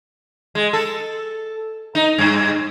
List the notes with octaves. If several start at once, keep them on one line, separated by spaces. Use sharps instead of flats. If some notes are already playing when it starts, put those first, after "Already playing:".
G#3
A4
D#4
G2